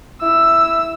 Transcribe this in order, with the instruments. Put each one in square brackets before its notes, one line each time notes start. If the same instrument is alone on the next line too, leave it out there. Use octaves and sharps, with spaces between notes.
[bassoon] E4 [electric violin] E6